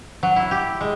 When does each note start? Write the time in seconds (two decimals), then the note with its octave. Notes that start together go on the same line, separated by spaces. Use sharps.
0.23 F#3
0.36 E4
0.51 G4
0.81 G#3